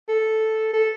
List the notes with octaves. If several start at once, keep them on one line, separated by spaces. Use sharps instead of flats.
A4
A4